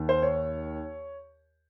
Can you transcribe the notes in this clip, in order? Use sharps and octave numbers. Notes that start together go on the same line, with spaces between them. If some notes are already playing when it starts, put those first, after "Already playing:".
Already playing: D#2 D#3
C5
C#5